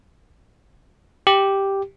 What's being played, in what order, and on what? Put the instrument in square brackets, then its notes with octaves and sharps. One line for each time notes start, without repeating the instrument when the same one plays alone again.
[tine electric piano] G4